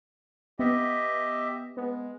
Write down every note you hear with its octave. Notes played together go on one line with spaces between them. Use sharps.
B3 G4 D#5 E5
G#3 B3